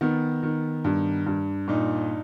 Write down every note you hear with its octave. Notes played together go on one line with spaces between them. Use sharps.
D#3 B3
D#3
G2
G2
A#2 D#4